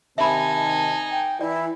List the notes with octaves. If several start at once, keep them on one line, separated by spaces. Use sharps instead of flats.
C3 D#3 D#4 E5 G#5 A5 B5
G5
E3 E4 D5